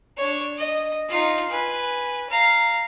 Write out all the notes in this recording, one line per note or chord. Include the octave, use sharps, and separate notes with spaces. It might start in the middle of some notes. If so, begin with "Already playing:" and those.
D4 C#5
D#5
D#4 F4
B4 G#5
F5 A#5